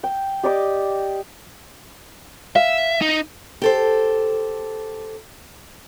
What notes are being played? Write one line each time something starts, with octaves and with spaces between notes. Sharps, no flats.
G5
G4 D5 D#5 D6
E5 F5
D#4
G4 A4 C5